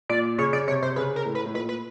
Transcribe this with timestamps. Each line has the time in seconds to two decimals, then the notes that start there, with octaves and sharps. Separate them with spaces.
0.09 A#2 D5
0.38 C#3 C#5
0.53 C#3 D5
0.68 C3 C#5
0.82 C3 C5
0.96 C#3 B4
1.16 A#4
1.25 A2
1.35 B4
1.45 A2
1.54 A#2 B4
1.69 B4